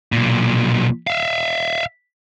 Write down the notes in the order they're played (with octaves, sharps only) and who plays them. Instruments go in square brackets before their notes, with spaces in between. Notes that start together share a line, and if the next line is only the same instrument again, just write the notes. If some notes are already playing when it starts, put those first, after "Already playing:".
[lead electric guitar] B1 A#2
E5 F5